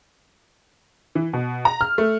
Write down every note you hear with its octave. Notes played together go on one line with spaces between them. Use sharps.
E3
B2
A#5
F6
A3